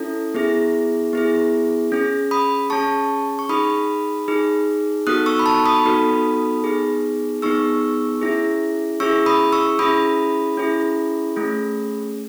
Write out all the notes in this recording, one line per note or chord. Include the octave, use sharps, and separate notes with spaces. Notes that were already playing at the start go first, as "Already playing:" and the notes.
Already playing: C#4 E4 A4
B3 E4 G#4
B3 E4 G#4
C#4 G#4
B5 D#6
C#4 G#4 A5 C#6
C#6
D#4 G#4 B5 D#6
D#4 G#4
B3 D#4 F#4 A4 D#6 F#6
C#6 E6
B5
A5 C#6
B5 D#6
B3 D#4 F#4 A4
B3 D#4 G#4
B3 D#4 G#4 C#6 E6
C#4 E4 G#4
C#4 E4 G#4 C#6 E6
B5 D#6
C#6 E6
C#4 E4 G#4 B5 D#6
C#4 E4 G#4
A3 C#4 G#4